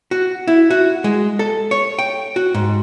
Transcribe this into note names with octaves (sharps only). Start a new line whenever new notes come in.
F#4
E4
F#4
G#3
A4
C#5
G5
F#4
G#2